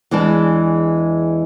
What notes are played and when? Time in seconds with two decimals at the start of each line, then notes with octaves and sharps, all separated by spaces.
0.11 E2 E3 G#3 D4 A5